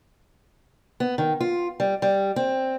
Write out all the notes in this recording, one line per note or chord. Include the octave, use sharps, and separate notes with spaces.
B3
D#3
F4
G3
G3
C4